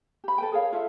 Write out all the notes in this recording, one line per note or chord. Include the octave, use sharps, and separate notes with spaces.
G4 B5
A4 B4 G5
G#4 A#4 C#5 F5
F4 A4 E5 F5